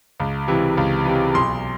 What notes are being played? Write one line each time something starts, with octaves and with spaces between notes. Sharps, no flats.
C#2
C3 E3
C#2
C3 E3
B1 C6